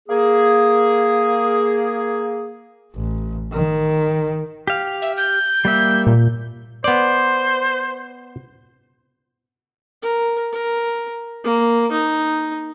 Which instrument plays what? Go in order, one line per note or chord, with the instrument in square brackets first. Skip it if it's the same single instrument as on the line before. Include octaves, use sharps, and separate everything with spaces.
[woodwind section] A#3 G#4
[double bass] A1
D#3
[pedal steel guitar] G4 F5
[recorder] E5
G6
[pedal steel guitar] G3 A#3 E5
[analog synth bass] A#2
[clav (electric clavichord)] B3 D5 [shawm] C5
[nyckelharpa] A#4
A#4
A#3
D#4